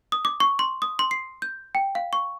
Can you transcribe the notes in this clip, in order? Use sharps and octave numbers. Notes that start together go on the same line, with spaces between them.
D#6
D6
C#6
C6
D#6
C6
C7
G6
G5
F5
C#6